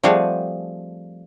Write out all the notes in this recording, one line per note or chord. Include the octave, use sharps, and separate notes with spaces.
F3 G3 A3 C4 G#4 F#5